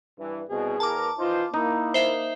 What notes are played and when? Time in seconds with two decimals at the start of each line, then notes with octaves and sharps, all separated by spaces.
0.19 G2 E3
0.50 C2 B2 G#4
0.80 E2 A#4 A5 D6
1.19 E3 D#4 F4 C5
1.53 A#3 D#4 E4
1.94 C5 E5